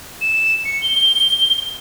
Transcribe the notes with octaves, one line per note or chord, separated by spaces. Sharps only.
E7
C#7
G7